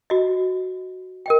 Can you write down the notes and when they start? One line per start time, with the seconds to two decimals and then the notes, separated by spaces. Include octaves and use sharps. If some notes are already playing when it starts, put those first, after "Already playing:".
0.10 F#4 D#5
1.26 A#4 D#5 G5